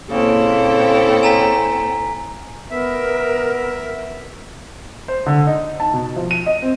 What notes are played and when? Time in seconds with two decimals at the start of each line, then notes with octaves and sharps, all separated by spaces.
0.11 A#2 C#3 A#3 C4 E4 A4 G5
1.23 G#5 A#5 B6
2.71 B3 A#4 E5
5.08 C5
5.26 D3
5.47 D#4
5.80 A5
5.94 B2
6.16 F3
6.31 D#7
6.46 D#5
6.62 C4